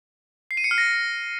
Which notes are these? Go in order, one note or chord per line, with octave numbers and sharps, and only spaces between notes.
C7
D#7
C#7
F6
A#6